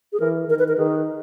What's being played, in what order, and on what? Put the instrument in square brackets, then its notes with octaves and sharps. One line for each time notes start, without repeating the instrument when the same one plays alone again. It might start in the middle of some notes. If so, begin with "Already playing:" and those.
[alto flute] G#4
[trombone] E3 [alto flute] A#4
[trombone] D#3 [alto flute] A#4
[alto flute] B4
A#4
[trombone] D#3 [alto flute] G#4